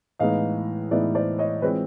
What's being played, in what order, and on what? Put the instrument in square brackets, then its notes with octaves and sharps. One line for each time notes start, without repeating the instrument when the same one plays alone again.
[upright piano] A2 E3 G#3 B3 D#4 D#5 F5
A2 E3 G#3 B3 D#4 D5 E5
C5 D5
C#5 D#5
E3 G#3 C4 F4 B4 C#5